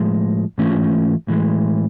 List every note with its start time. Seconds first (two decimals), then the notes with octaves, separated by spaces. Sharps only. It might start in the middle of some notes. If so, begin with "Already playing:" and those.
Already playing: A2 F3 G#3
0.58 G#2 E3 A3 C#4 F4
1.28 A2 E3 G#3